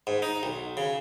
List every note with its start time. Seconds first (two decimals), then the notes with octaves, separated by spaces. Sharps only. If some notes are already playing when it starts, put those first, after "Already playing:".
0.07 G#2
0.22 D#4
0.43 B1
0.77 C#3